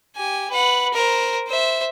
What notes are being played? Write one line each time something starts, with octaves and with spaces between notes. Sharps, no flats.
G4 G#5
B4 F#5
A#4 C5
C5 E5